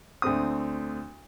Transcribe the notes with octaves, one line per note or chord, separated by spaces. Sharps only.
D2 A3 C4 D#6